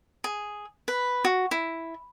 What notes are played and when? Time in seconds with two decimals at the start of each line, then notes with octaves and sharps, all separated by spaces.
0.24 G#4
0.88 B4
1.25 F#4
1.51 E4